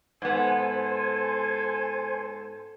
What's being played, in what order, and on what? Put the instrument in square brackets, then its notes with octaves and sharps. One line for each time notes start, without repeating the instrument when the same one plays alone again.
[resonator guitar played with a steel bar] G#2 B3 [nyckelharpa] A4 [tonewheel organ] C5 G#5